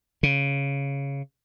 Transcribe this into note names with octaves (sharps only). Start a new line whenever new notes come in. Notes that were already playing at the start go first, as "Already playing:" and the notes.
C#3